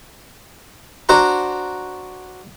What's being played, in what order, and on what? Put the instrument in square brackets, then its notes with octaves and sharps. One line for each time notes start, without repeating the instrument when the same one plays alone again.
[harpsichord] D4 F#4 C5 F#5 A#5